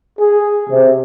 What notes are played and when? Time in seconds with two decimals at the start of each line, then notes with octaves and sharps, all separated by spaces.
0.20 G#4
0.70 C3